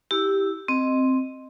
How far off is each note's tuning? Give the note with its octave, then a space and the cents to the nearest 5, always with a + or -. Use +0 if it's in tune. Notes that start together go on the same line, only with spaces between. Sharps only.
E4 -25 G4 +0 E6 +0
C4 +0 D#5 -5